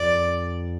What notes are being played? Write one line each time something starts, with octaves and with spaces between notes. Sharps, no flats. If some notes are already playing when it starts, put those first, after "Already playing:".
Already playing: F2 D5